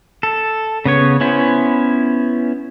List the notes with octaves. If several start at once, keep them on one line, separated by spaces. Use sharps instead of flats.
A4
C#3 B3 C#5
B3 C#4 E4 C5